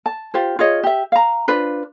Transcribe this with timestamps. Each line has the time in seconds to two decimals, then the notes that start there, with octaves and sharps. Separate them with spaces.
0.06 A5
0.34 F4 G4 C5
0.59 F4 G#4 C#5 D#5
0.83 G4 E5
1.12 F5 A#5
1.48 D4 F4 B4 C5